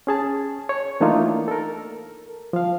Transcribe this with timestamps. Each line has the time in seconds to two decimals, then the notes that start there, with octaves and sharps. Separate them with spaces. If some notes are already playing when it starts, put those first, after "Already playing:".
0.07 C#4 G#4 A5
0.69 C#5
1.01 E3 A3 A#3 D4 D#4 F4
1.48 A4 A#4
2.53 F3 F5